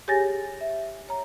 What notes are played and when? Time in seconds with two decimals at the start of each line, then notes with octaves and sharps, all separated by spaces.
0.08 G4 G#4 C#5 G#5 A6 A#6
0.61 E5
1.09 C#5 A#5